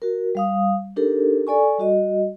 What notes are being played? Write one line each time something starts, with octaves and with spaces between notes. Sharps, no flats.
F#4 A#4
G3 F5 D#6
D4 D#4 G4 A4 A#4
A4 D5 G#5 C#6
G3 F#4 D#5